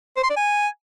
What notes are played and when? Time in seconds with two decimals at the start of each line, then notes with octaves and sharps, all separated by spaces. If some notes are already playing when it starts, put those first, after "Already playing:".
0.17 C5
0.23 C6
0.30 D5
0.37 G#5